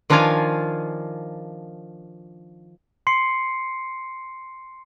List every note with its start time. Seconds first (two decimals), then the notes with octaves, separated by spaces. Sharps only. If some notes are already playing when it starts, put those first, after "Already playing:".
0.10 D#3 F3 D4 F4 F5 G#5
3.07 C6 C7 C#7